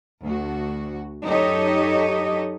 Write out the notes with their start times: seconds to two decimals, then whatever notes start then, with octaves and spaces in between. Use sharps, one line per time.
0.23 D2 F#4
1.26 F#2 D#4 G4 A4 C#5 D#5